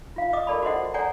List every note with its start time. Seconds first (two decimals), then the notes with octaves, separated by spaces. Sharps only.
0.16 F4 F5
0.33 D#5 D6 D#6
0.47 A4 A#4 D5 A5 B5
0.63 F#4 A4 C5 D#5 F#5
0.94 A4 C#5 D5 F#5 G#5 A#5